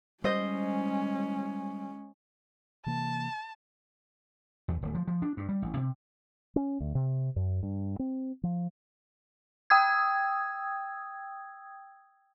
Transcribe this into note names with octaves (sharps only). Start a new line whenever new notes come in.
G3 G#3 C#4 C5 D#5 G6
C3 E3 A#3 A5
E2
D1
F3
F3
D4
G2
G3
A1
C3
C#4
D2
C3
F#2
G2
C4
F3
G5 D#6 E6 G#6